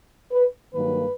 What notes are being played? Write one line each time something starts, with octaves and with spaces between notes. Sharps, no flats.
B4
G2 D#3 F#3 A#3 B4